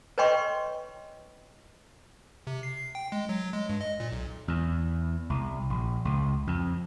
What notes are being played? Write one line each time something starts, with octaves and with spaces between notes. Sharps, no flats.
B4 C#5 D#5 G5 C6 C#6
C3
C7
C7
G5
G#3
F#3
G#3
G2
D#5
A#2
B1
E2
C2
A#1
C#2
F2